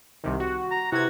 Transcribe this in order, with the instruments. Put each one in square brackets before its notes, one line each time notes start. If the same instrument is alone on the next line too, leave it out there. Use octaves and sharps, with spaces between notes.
[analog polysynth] C2 C3 D#3
F#4
[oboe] A#5
[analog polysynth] C3 G#6 [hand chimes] E4 B4 [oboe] F#4